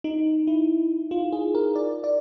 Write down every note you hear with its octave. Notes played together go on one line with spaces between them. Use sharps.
D#4
E4
F4
G#4
A#4
D5
D5